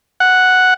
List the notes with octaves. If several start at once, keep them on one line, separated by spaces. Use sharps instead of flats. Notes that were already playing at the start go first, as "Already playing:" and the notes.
F#5